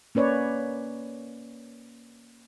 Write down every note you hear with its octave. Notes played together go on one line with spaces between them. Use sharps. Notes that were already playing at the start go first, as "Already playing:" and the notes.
A#3 C#4 B4 C#5 D5